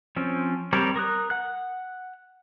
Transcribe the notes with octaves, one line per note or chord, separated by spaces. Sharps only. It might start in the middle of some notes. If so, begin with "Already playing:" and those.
F3 C4 C#4
G3 C4 A#4 C#5 D5
A#4 D#6 F#6
F#5 F#6